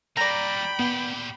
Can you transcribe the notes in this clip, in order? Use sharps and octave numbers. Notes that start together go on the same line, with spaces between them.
G3 A#3 D5 G5 A#5 B5
A#2 B3 G4